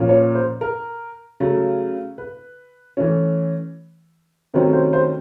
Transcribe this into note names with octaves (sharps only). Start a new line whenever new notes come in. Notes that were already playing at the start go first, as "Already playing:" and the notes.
Already playing: A#2 F3 A#3 C#4
C#5
C5
A#4
C#3 F#3 A3
B4
E3 A3 C#4
C3 D#3 F#3 A3 C#4 C5
C5
C5